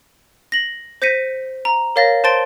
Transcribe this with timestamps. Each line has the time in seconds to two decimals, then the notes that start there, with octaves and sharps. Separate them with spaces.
0.52 A#6 F#7
1.02 C5 G6 A#6 B6 C#7 D#7
1.65 A#5
1.96 A#4 C#5 F5 A6 A#6
2.24 C5 A5 C6 A6 D7 G7